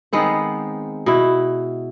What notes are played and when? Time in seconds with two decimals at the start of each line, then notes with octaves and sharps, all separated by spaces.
0.13 D#3 G#3 B3 C4
1.06 B2 E4